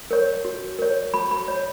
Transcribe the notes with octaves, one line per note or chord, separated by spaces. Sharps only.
A#4 C#5
F#4
A#4 C#5
F#4 B5
B5
C#5